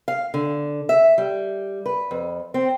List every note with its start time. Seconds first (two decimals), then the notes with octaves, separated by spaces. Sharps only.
0.08 F5
0.34 D3
0.89 E5
1.18 G3
1.86 B4
2.11 F2
2.54 C4